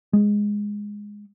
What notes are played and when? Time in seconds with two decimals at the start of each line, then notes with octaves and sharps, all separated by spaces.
0.13 G#3